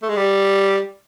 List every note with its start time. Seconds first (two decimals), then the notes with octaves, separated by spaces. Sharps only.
0.03 A3
0.09 G#3
0.16 G3